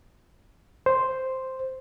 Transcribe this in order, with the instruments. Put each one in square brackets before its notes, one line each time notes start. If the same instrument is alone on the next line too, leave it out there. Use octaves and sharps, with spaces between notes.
[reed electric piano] C5